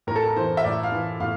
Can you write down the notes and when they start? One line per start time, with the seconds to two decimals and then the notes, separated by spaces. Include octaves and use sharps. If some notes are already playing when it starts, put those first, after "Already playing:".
0.07 A2 A#4
0.16 A4
0.24 A#4
0.36 E3 C5
0.57 E5
0.64 A2 D5
0.83 F5
0.92 E3
1.20 A2 F5